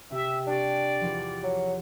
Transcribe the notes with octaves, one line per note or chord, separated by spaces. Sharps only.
C3 G4 E5
D4 G4 D5 G5 C#6
E2 F3
F#3